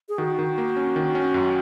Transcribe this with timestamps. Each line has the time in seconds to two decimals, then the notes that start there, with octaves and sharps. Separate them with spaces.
0.09 G#4
0.18 D#3 F#4
0.39 D#3
0.58 A#3
0.76 C#4
0.96 D#3
1.15 C#4
1.34 F#2